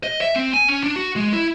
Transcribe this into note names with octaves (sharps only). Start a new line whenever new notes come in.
D#5
E5
C4
G#5
C#4
D4
F#4
G#3
E4